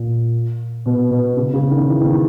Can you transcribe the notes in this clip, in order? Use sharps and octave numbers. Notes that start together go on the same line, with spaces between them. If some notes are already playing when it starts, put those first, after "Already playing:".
Already playing: A#2
B2
B2
C#3
C#3
D#3
E3
D#3